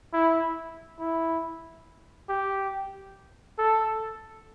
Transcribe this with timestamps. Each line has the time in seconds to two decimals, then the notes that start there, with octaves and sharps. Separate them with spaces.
0.13 E4
0.99 E4
2.29 G4
3.59 A4